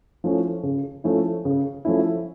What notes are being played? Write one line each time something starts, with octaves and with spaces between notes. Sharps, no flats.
F3 A3 C#4 E4
C#3
F3 A3 C#4 E4
C#3
F3 A3 C#4 E4